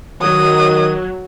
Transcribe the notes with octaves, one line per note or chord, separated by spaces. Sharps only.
D#3 F#3 D#6